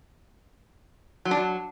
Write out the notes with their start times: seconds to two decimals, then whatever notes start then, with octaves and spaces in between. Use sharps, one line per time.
1.25 F#3
1.31 D4
1.37 F#3